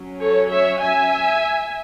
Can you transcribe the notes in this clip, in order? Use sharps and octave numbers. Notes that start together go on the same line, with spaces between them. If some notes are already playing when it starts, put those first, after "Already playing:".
Already playing: F#3 C#4
A4 C#5
C#5 E5
E5 G#5